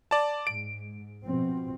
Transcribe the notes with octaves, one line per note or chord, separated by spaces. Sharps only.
D5 A5
G#2 D7
B2 F3 C4